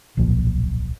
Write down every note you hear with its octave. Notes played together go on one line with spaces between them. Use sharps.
D1 B1 A#2 F3